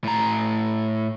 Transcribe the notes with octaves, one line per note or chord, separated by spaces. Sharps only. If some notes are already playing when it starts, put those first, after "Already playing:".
A2 A#5